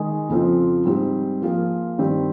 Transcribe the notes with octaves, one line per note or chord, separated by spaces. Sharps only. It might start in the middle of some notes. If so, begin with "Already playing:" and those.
Already playing: D#3 G#3 D#4 G#4
F2 C#3 F3 C4
G#2 G3 C4 G4
F3 A#3 F4 G#4
G2 D#3 G3 C4 G4